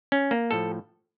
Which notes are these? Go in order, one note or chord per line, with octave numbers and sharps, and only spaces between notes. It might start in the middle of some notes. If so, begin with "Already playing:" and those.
C#4
A#3
A2 F3 A4